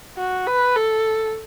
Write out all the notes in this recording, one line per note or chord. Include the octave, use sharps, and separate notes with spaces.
F#4
B4
A4